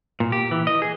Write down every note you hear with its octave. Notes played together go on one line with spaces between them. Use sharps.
A#2
G4
E3
D#5
G#4